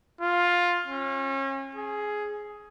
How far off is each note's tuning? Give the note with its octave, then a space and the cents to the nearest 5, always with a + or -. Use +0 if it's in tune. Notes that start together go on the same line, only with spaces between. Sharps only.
F4 +10
C#4 -35
G#4 +10